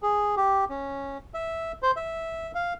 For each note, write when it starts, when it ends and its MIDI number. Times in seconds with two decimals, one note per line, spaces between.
0.03 0.35 68
0.37 0.65 67
0.70 1.18 61
1.34 1.72 76
1.83 1.91 72
1.96 2.52 76
2.55 2.73 77